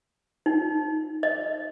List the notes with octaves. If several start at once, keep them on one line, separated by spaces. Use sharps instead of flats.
D#4
D#5